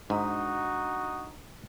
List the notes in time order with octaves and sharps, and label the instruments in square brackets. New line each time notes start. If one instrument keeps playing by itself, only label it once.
[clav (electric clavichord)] G#2 [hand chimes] D4 A#5 [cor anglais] D#4 [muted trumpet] F#4